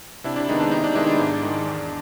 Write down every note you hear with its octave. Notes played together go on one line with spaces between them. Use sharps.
C3 D4 E4
D4
D#3 G#3 B3 D#4
D4
C3 D#4
D4
D#3 G#3 B3 D4 E4
D#4
G#2 D4
D#3 G#3
E2